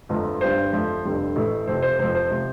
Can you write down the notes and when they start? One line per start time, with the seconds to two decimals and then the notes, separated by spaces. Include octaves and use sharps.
0.09 G1 F2 F3 A3
0.41 G1 G2 G3 C5
0.72 F2 F3 A3
1.04 F1 F2 D3 G3
1.36 A1 A2 A3
1.67 F1 F2 C3 C5
1.82 C5
1.99 F1 F2 F3 C5
2.15 C5
2.30 C3 F3